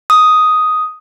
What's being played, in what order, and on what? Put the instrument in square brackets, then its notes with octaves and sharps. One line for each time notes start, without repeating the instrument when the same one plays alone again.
[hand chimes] D#6